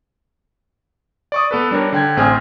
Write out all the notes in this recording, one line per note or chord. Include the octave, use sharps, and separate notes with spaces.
D5 C#6 D#6
B3 A4 B4
G3 D4 A#4 C#5
D3 G5 G#6
A1 C4 G#4 G#5 F6